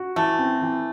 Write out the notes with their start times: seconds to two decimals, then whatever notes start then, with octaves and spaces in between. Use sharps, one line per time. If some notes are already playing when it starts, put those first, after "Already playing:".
Already playing: F#4
0.16 E3 A3
0.38 C4
0.62 E3